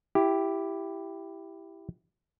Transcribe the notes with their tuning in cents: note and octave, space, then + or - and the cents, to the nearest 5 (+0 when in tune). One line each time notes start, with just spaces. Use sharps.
E4 +10 G4 +0